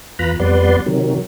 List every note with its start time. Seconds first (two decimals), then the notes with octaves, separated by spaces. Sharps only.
0.19 E2 F4 B4 A#5 B5
0.40 F2 G3 B3 B4 D5 C6
0.86 C3 D#3 F#3